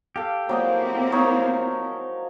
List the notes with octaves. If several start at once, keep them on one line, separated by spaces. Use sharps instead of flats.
G4 A4 F5
F3 F#3 G#3 A#3 C4 E4 D5 D#5
F3 D#4 A#4 C#5